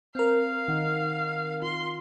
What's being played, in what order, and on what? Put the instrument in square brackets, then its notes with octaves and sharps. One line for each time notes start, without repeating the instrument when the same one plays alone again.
[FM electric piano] C4 A#4 [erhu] F5
[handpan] D#3 D#4 F#5
[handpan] F4 [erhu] C6